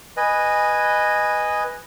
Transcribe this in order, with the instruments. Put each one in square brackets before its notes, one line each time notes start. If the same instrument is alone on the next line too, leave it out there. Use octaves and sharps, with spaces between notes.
[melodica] B4 D#5 G#5